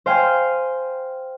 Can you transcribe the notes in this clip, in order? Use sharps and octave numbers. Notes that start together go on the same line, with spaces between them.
C5 F5 G5 G#5